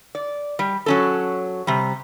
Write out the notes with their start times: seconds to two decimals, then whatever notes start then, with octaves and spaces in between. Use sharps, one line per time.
0.15 D5
0.59 G3
0.86 F#3 C#4 A4
1.67 C3 G3